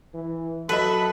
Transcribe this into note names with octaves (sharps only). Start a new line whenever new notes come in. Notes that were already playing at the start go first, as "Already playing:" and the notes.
E3
F#3 A4 B4 D#5 E5 B5